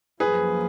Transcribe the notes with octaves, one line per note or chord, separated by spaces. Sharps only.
F#2 F3 A#3 G#4 B4